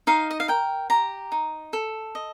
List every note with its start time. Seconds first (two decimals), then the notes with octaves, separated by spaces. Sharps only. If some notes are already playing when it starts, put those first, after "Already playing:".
0.07 D#4 F5
0.31 D#5
0.40 F5
0.48 A#4 G5
0.90 G4 A#5
1.32 D#4
1.73 A4
2.15 D#5